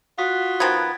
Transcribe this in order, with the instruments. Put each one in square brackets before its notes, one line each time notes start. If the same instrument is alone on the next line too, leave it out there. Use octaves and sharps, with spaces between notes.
[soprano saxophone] F4 [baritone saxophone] F#4 [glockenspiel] D#6 B6
[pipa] D#3 F3 B3 [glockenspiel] G#6 A6 D7